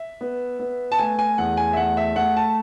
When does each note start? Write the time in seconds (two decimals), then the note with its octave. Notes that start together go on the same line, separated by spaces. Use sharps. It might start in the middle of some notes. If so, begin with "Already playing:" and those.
Already playing: E5
0.21 B3
0.59 B3
0.92 A5
0.98 A3 G#5
1.19 G#5
1.38 E2 F#5
1.57 G#5
1.73 E5
1.77 A3 F#5
1.97 E5
2.16 A3 F#5
2.36 A5